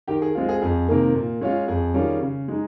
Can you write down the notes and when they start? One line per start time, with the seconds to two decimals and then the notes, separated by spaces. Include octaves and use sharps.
0.08 D#3 G4
0.22 G#4
0.35 G#3 C4 F4
0.49 G#4
0.62 F2 G#4
0.88 C3 D#3 A#3
1.15 A#2
1.41 G#3 C#4 F4
1.68 F2 G#4
1.94 D#3 G3 C#4 F4
2.21 C#3
2.48 G#3 D#4